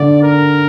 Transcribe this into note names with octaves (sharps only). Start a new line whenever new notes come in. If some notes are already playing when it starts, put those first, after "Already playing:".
Already playing: D3 D5
A#4